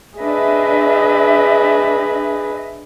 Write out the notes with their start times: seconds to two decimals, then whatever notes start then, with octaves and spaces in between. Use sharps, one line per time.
0.19 D4 G#4 B4 D#5 E5